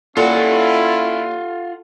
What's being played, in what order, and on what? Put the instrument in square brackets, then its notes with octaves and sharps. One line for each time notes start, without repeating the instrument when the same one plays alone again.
[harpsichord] A#2 [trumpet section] C#4 E4 [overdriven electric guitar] F4 F#5 [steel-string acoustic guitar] A4